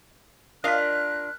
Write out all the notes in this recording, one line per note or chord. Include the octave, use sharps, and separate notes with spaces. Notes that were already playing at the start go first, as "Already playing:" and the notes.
D4 F4 A#4 D#5 F5 F6 F#6 B6